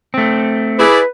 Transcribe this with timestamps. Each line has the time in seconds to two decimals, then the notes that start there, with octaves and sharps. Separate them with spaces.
0.14 A3 C4
0.78 E4 G#4 B4 D5